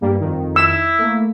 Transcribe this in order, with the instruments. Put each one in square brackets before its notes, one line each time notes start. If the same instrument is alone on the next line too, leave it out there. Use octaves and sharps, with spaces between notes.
[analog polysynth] G2 G3 A#3
F2 D#3
[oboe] E4 [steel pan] E6
[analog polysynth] A3 A#3